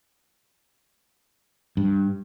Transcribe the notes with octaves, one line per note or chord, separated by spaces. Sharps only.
G2